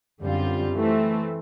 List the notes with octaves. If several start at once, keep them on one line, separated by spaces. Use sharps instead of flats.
F#2 D3 G3 C4 F4
E3 A3 C4